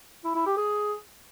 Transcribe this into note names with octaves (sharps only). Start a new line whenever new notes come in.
E4
E4
G4
G#4